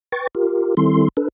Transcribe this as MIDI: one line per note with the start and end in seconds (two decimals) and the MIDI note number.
0.12 0.27 71
0.12 0.27 79
0.12 0.27 85
0.12 0.27 93
0.35 0.75 65
0.35 0.75 67
0.35 0.75 70
0.77 1.08 51
0.77 1.08 55
0.77 1.08 60
0.77 1.08 64
0.77 1.08 69
0.77 1.08 84
1.17 1.28 62
1.17 1.28 69
1.17 1.28 71